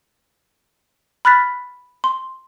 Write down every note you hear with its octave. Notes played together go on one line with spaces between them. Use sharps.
B5 F6 F#6 A6 B6
C6